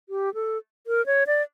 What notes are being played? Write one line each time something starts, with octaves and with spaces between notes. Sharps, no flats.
G4
A4
A#4
C#5
D5